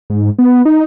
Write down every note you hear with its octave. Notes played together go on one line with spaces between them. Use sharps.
G#2
B3
D#4